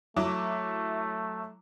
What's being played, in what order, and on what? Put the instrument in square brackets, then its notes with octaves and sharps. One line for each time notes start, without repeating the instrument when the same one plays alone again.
[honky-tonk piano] F#3 E4 D6 [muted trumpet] A3